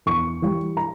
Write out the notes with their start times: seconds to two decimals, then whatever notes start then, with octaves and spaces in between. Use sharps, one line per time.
0.06 E2 C#6
0.42 E3 G3
0.77 A#5